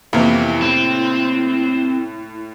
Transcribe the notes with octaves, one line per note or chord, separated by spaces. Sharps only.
F2 C3 E3 A#3 B3 E4
A2 C4